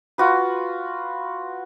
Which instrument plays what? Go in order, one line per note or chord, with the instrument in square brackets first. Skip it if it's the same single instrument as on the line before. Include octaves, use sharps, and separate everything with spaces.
[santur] F4 F#4 B4